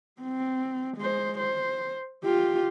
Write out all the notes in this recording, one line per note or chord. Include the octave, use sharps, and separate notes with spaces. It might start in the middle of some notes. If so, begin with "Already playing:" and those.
C4
G#3 C5
C5
F4 G4